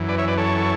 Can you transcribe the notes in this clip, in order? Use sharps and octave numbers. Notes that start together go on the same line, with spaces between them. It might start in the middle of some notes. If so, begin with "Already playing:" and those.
Already playing: F#2 E3
B4 D5
C#5 E5
B4 D5
A4 C#5